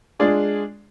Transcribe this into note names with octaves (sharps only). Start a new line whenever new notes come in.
G#3 D4 F4 G#4 D5